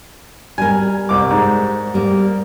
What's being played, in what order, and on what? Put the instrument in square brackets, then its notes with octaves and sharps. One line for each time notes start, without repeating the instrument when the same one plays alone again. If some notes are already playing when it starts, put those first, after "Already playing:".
[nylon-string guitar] G3 A#4 [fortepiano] G#5
[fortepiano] C2 D6
G#2
[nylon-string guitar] G3 A#3